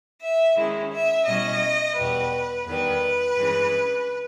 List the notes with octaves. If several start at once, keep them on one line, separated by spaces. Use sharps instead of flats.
E5
D#3 G#3 C#4 E4
E5
B2 G3 C#4 E4 D#5
E2 B2 G3 B4
E2 D#3 G3 B4
G2 E3 G#3 C#4